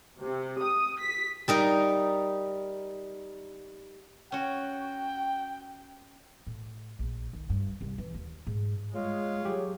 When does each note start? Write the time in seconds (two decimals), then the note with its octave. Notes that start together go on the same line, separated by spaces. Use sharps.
0.21 C3
0.62 D#6
1.01 B6
1.48 G3 D#4 A#4
4.32 C#4 F#4 G5
6.47 A2
6.99 A#1
7.33 D#3
7.50 G2
7.81 C2
7.98 E3
8.14 D#2
8.47 G#2
8.94 G#3 F4 C#5
9.45 F#3 G4 G#4